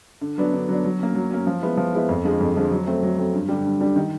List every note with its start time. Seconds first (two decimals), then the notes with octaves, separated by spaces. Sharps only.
0.21 D3
0.38 F#3 B3 D4
0.53 D3
0.69 F#3 B3 D4
0.84 F#3
0.99 A#3 C#4
1.15 F#3
1.31 A#3 C#4
1.47 F3
1.62 G#3 B3 E4
1.77 F3
1.93 G#3 B3 E4
2.09 F2
2.24 D3 F3 G#3
2.41 F2
2.55 D3 F3 G#3
2.72 F#3
2.87 A3 C4
3.03 F#3
3.17 A3 C4
3.34 G2
3.49 D3 G3
3.65 G2
3.81 D3 G3
3.96 D#3